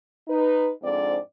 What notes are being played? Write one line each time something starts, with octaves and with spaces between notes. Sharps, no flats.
D#4 B4
F2 G#2 C4 D4 D5